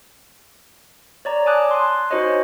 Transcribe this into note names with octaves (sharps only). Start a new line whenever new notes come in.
C#5 D5 A#5
G#5 A5 D6 D#6 F#6
G#5 C6
D#4 F#4 C5 C#5 D#5